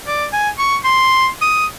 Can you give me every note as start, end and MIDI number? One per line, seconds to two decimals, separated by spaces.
0.07 0.26 74
0.33 0.49 80
0.59 0.77 85
0.84 1.29 84
1.41 1.66 87